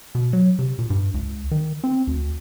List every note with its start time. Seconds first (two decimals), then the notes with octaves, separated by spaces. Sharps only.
0.15 B2
0.33 F#3
0.59 C3
0.79 A#2
0.90 G2
1.14 C#2
1.51 D#3
1.84 C4
2.07 D2